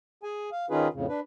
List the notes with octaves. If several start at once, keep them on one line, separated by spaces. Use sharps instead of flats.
G#4 G#5
F5
D#3 C#4 D#4 F4 G#4 B4
F2 A2 C#3
D4 B4